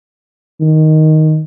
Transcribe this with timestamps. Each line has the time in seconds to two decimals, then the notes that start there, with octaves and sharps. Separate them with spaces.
0.61 D#3